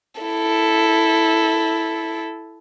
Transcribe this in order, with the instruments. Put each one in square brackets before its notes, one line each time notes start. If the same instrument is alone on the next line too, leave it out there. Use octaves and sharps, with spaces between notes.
[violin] E4 A4